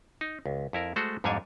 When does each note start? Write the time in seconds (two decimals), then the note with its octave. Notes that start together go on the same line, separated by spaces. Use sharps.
0.21 D#4
0.46 C#2
0.73 F2 E4 A#4
0.96 G#3 A3 F#4 A4 C5
1.24 F2 G#2 G3 D4 C#5 G#5